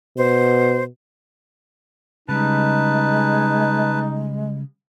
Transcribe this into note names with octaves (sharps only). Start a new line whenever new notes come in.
B2 C5
C#3 G3 G#3 D#4 B4 A5